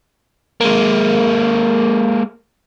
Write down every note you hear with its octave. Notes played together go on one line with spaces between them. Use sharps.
G#3 A#3